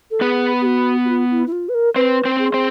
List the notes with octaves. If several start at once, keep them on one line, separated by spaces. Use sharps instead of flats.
A4
B3 G#4 B4
G4
F#4
F#4
F4
E4
E4
F4
B4
A#4
C4 B4 C5
C4 C5
G#4
C4 C5